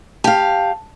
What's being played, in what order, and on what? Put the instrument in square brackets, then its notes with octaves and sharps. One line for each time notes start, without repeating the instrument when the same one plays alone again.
[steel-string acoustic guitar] G4 F5 [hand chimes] A5